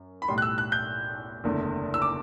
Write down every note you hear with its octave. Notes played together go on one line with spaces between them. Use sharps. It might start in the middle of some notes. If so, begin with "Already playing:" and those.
Already playing: F#2
B5
B1 A2 G3 C6
F#6
E6
F#6
G6
F#1 E2 D3 A3
E6
D6